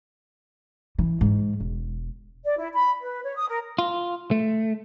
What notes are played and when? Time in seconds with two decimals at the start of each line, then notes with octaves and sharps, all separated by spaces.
0.99 E3
1.21 G#2
1.60 E1
2.45 D5
2.58 E4
2.74 B5
3.01 B4
3.24 C#5
3.37 D#6
3.48 A#4
3.79 F4
4.31 A3